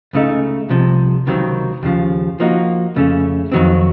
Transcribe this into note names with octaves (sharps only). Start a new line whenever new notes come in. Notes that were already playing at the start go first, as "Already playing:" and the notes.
C#2 C#3 A3 D#4
C2 C3 F3
C#2 C3 D#3 F#3 C4
D#2 C#3 F3
F3 A#3 D#4 F#4
F2 C#3 A3 C#4
F2 D#3 F#3 C4